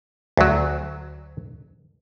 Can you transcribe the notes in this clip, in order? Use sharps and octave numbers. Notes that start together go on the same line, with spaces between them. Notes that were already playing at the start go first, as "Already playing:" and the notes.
D2 F#3